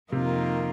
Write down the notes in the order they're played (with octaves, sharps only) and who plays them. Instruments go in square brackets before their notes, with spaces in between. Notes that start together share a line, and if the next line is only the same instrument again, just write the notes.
[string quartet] F2 D#3 A#3 F4 [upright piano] C3